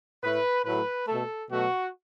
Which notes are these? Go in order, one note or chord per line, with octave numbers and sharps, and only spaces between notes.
A2 A3 B4
A2 F#3 A3 B4
B2 A3 A4
B2 F#3 A3 F#4